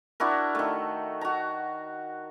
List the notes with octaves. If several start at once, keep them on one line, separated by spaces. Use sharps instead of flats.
D4 E4 F#4 A#4
D#3 A3
F#4 A#5